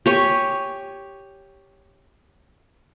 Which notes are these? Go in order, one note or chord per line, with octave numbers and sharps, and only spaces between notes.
G4 C#5 G#5